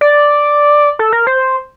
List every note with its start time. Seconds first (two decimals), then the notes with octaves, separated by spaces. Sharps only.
0.01 D5
0.99 A4
1.13 A#4
1.27 C5